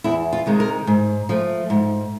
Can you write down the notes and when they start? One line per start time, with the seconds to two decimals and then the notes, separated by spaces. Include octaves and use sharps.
0.04 E2 E4
0.33 F4
0.46 C3 D#3 G#3
0.60 A#4
0.87 G#2
1.29 F3 A3
1.70 G#2